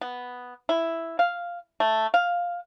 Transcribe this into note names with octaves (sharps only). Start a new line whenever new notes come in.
B3
E4
F5
A3
F5